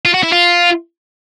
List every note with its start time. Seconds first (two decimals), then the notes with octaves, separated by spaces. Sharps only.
0.05 F4
0.14 F#4
0.23 E4
0.32 F4